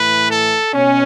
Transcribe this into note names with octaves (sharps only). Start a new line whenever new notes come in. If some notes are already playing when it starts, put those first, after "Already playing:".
Already playing: A2 E3 B4
A4
B2 C#4